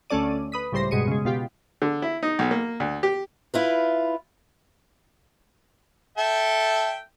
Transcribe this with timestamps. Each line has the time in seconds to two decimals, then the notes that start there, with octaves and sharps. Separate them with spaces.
0.10 D2 A3 C#4 A4 D5 D#7
0.52 B4 D#6 B6
0.72 C#2 A2 G3 C5 C6 A#6
0.91 G2 B2 G#3 C#7 D#7
1.07 C#3 G#3
1.25 B2 F4 G4
1.82 D3
2.02 E4
2.23 D#4
2.39 B1
2.51 A#3
2.80 D2
3.03 G4
3.54 E4 F4 B4
6.18 A4 E5 G5